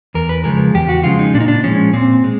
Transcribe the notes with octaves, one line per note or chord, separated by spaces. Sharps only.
E2 A#4
B4
C#3 F3 G#3 A#4
E2 G4
F#4
C#3 F3 G#3 F4
D#4
A#2 D4
D#4
D4
F3 G#3 C#4
A#2 C4
G#3